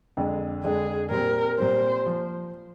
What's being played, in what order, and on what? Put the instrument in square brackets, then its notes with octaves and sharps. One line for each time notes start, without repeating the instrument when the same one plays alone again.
[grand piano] F2 D3 G#3 D4
[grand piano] F2 D3 G#3 D4 [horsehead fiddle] G#4
[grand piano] A#2 G3 C4 [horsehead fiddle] A#4
[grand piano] A#2 G3 C4 [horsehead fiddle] C5
[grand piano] F3